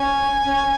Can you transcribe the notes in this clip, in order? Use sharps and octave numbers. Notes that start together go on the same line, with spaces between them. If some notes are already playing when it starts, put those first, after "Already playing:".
Already playing: C#4 G#5
C#4